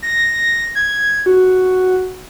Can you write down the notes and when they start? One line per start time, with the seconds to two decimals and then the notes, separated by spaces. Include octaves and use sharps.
0.02 A#6
0.75 G#6
1.26 F#4